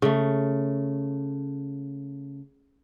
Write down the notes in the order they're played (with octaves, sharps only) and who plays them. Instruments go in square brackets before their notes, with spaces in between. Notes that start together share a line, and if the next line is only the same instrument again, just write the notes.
[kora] C#3 A3